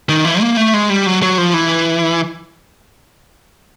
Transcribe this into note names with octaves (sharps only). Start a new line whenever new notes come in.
D#3
E3
A#3
A3
G#3
G3
F#3
F#3
F3
E3